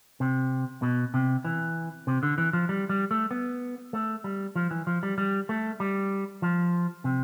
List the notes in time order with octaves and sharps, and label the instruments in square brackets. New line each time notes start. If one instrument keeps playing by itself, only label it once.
[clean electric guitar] C3
B2
C3
E3
C3
D3
E3
F3
G3
G3
A3
B3
A3
G3
F3
E3
F3
G3
G3
A3
G3
F3
C3